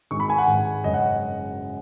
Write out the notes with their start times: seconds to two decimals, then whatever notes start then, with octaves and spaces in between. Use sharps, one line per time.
0.11 G#1 G#2 G#3 C#6
0.20 B5
0.30 G#5
0.38 F#5
0.47 G#1 G#2 G#3
0.84 F#1 F#2 C#3 G#3 D#5
0.94 F#5